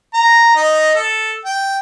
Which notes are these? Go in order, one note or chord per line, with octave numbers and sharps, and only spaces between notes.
A#5
D#4 D#5
A4
G5